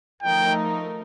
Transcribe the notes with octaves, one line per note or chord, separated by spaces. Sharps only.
F3 A3 D#4 A#4 G5